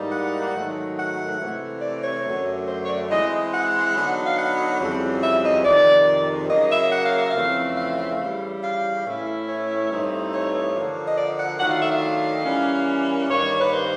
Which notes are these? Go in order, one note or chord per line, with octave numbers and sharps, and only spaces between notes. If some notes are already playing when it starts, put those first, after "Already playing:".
Already playing: G#2 E3 G3 A#3 D#4
F#5
G#2 D#3 F#3 A3
F#5
C3 E3 A3
D5
C#5
F#2 D3 F#3 A3
C5
C#5
D5
E3 G#3 C4 D#5
F#5
D3 F#3 B3 D#4
F5
F#5
F2 C#3 E3 G3 C4
E5
D#5
F2 C3 D#3 G#3 D5
C#3 F#3 A#3 D#5
E5
F#5
F5
E5
F2 C#3 E3 A3 C4 F5
F5
F5
C#3 E3 G3
F5
A2 E3 A3 C#4 E4
C#5
G2 E3 A3 C4 D#4
C#5
D3 F3 A#3
D#5
D5
F#5
D#3 F#3 A3 D4 F4 F#5
F5
E5
F5
E3 G3 A#3 C#4
G2 D#3 G3 A#3 C#5
B4
C5